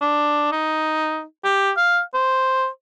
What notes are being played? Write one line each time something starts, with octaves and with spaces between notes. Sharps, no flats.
D4
D#4
G4
F5
C5